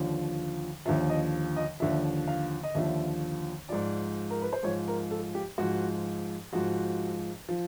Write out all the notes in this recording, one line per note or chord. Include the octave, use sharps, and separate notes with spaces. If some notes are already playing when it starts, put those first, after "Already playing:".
Already playing: D#2 D3 F3
D#2 D3 F3 E5
D#5
D#5
D#2 D3 F3 E5
F5
D#5
D#2 D3 F3 E5
G#2 F3 D5
A#4
B4
C5
G#2 F3 C#5
A#4
A4
G4
G#2 F3 F#4
G#2 F3 F#4
F3